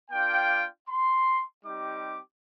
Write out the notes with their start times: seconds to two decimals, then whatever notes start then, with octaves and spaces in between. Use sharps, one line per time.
0.11 A#3 D4 F4 G5
0.89 C6
1.65 G3 C4 D#4 G4 D6